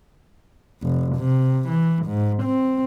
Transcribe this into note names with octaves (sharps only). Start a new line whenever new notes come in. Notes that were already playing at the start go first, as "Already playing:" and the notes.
F1
C3
E3
G#2
C4